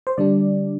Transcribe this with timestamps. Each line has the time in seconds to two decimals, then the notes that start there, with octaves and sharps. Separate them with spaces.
0.07 C5
0.18 D3 G3 D4 D5